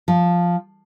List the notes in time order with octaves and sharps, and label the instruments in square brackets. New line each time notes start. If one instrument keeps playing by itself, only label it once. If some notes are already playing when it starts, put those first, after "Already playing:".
[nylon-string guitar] F3